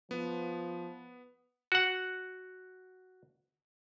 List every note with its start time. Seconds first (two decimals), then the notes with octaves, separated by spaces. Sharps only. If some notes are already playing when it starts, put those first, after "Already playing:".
0.11 F3 B3
1.72 F#4 F#5